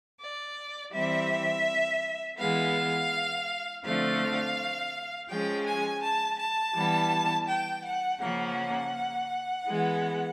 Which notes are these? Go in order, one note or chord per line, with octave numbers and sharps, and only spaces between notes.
D5
E3 G3 C4 E5
E3 G#3 B3 F5
D3 F3 A3 C4 F5
F3 G#3 C#4 G5
G#5
A5
A5
E3 G3 B3
G5
F#5
C#3 F3 A#3 C#4 F#5
E3 G#3 B3